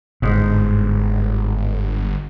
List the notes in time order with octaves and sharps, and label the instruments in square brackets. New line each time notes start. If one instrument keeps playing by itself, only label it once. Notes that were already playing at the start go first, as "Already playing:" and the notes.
[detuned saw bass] G1 [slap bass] G#2